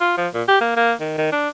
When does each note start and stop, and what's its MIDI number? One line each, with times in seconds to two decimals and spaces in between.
0.01 0.13 65
0.18 0.28 53
0.34 0.43 46
0.48 0.58 67
0.61 0.74 58
0.76 0.93 58
1.00 1.17 51
1.18 1.32 51
1.32 1.49 62